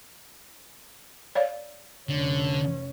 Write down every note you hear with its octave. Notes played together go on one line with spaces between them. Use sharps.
C#5 D5 F5
F1 D3 C#4